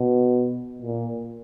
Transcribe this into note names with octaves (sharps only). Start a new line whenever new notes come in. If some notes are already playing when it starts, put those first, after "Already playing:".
Already playing: B2
A#2